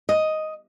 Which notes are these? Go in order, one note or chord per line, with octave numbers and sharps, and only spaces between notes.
D#5